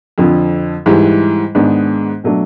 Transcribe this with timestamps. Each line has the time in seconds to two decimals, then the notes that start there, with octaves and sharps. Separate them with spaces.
0.18 F2 D3 F3
0.86 G#2 E3 G3
1.55 G#2 D#3 G#3 B3 D4
2.24 B2 F#3 A3 D4